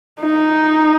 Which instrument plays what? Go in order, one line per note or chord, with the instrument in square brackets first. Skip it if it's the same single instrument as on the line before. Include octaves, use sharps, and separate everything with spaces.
[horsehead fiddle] D#4